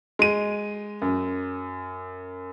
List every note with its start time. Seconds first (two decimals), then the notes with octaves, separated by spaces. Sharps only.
0.19 G#3 D#7
1.02 F#2